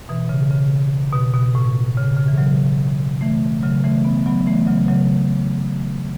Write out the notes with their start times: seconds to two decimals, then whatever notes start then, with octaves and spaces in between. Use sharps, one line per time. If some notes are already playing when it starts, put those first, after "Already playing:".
0.09 B2 E3
0.29 C#3
0.51 C#3
1.13 B2
1.34 B2
1.55 A2
1.97 C#3
2.17 C#3
2.28 E3
2.38 C#3 F#3
3.21 E3 A3
3.63 C#3 F#3
3.84 E3 A3
4.04 B3
4.26 F#3 B3
4.47 E3 A3
4.67 C#3 F#3
4.88 C#3 F#3